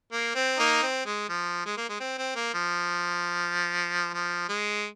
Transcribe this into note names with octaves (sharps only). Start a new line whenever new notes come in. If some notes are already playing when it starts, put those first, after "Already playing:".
A#3
C4
A#3 D#4
C4
G#3
F3
G#3
A#3
G#3
C4
C4
A#3
F3
F3
G#3